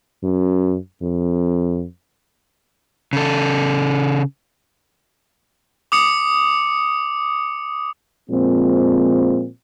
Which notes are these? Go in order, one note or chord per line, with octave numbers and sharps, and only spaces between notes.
F#2
F2
C#3 A4
D6 D#6 C#7
A#2 F3 G#3 C4